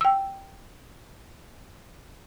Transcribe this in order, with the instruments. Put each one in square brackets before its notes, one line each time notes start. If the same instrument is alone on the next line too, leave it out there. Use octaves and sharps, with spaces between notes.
[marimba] G5 E6